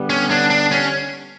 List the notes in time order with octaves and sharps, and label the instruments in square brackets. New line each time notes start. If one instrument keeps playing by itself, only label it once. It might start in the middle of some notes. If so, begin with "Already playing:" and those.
Already playing: [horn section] D3 G3 B3
[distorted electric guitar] C#4
D4
D4
C#4